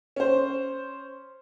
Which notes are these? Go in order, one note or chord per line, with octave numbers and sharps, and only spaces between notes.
C#4 C5